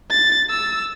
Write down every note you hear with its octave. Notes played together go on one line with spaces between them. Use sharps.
A6
E6